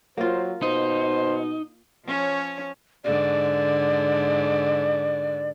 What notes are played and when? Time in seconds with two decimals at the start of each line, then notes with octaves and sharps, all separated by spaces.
0.17 F#3 A#3 F4 C5
0.62 B2 D#4 C5
2.05 F3 C#4 C#5
3.04 G#2 D3 D5